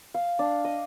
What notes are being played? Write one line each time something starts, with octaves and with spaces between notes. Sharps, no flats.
F5
D4
D#5